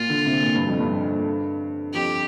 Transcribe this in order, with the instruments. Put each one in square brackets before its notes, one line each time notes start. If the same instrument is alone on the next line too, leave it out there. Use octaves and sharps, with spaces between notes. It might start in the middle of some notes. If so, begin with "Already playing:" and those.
Already playing: [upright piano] A#2 [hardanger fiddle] F4
[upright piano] D3
C3
A#2
G2
F2
G2
[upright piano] F2 [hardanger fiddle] G4